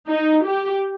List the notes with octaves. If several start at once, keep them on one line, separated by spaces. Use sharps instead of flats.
D#4
G4